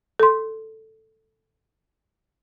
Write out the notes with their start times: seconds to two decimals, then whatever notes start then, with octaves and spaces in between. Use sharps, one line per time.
0.20 A4 C6